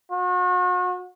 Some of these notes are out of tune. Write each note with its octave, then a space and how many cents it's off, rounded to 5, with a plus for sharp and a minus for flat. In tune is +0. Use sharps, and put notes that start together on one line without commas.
F#4 -40